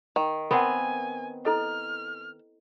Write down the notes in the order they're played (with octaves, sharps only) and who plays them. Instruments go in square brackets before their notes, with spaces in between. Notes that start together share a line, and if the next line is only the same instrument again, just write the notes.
[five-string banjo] D#3
[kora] B3 C4 [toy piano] A#4 F#5 [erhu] G#5
[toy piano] E4 A4 D#5 [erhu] F6